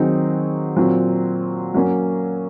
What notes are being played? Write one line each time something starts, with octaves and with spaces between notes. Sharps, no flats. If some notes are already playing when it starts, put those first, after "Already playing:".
Already playing: D#3 F#3 C4 D#4 G#4
A#2 F#3 C4
F#3 A#3 C#4